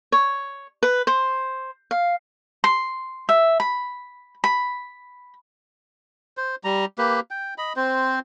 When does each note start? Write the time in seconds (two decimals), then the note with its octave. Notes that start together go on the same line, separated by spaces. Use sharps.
0.12 C#5
0.83 B4
1.07 C5
1.91 F5
2.64 C6
3.29 E5
3.60 B5
4.44 B5
6.37 C5
6.64 G3 A#5
6.98 A#3 G4 B4
7.31 G5
7.58 D#5 B5
7.76 C4 C5